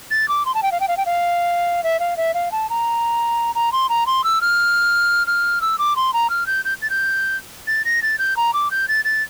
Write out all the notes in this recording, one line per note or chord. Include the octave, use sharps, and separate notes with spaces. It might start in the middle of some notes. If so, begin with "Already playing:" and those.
A6
D6
C6
A5
G5
F5
G5
F5
G5
F5
E5
F5
E5
F5
A5
A#5
A#5
C6
A#5
C6
E6
F6
F6
E6
D6
C6
A#5
F6
G6
G6
A6
G6
A6
A#6
A6
G6
A#5
D6
G6
A6
A6